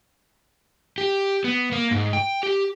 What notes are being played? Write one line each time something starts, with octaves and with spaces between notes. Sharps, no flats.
G4
B3
A#3
G#2
G5
G4